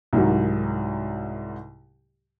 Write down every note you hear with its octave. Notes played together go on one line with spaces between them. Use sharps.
C2 G#2 D#3 F#3